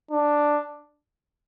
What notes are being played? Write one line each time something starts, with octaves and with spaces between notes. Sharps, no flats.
D4